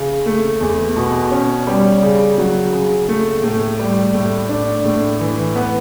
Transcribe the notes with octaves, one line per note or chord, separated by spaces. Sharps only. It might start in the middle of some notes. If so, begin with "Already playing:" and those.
Already playing: C#3
A3
E2
B2
C#4
G3
C#3
F#3
C#3
A3
A2
G3
A2
D4
A2
E3
B3